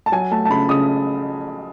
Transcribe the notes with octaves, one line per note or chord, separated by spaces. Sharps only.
A5
F#3 G#5
A3 A5
A5
C#3 B5
C#3 D#6